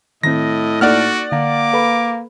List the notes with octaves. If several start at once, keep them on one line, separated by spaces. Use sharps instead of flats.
A2 D#3 C4 D#5 A#6
A#3 D#4 F#4 A4 D5 F#5 F6
D3 A#3 D6
A4 B4 B5